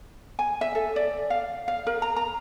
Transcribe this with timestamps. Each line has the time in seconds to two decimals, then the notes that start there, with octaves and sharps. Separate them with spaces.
0.39 G#5
0.61 E5
0.75 A4
0.96 D5
1.30 F5
1.68 F5
1.87 A#4
2.02 A#5
2.16 A#5